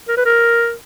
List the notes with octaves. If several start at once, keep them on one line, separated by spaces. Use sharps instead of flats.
A#4
B4
A#4